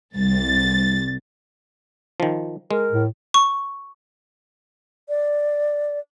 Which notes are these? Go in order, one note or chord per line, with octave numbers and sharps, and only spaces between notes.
C2 A6
D#3 F3
G#3 A#4
A2
C#6
D5